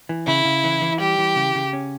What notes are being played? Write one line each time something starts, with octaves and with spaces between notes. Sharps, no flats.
E3
C#3 E4
C#3
E3
E3
G3 G4
E3
C#3
C#3
C#4